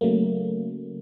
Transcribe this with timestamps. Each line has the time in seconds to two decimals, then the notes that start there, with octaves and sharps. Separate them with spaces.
0.01 C#3 F#3 A3 A#3